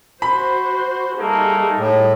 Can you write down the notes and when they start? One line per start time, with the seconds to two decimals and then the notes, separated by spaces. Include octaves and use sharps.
0.22 F#4 C5 B5
1.19 G3 A3 A#3 D#4 G#4 A4
1.78 A2